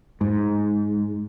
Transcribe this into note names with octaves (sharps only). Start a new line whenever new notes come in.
G#2